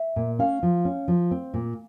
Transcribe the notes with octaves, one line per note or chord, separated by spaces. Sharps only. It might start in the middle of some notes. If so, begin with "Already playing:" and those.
Already playing: E5
A#2
C#4 F5
F3
C#4
F3
C4
A#2